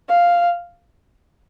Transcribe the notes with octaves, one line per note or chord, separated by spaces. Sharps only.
F5